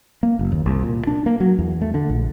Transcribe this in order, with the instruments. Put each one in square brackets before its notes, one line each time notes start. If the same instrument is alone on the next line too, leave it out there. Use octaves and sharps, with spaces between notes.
[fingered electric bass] A#3
F#1
D#2
C2
A#2
D4
A#3
F#3
E2
A3
D3
A#1